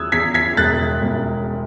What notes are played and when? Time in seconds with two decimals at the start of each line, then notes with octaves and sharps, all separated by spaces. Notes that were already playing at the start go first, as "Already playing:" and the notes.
Already playing: E2 D#6 E6 F#6 G#6
0.12 E2 G#6 B6
0.34 G#6 B6
0.57 E1 F#6 A6
1.02 E1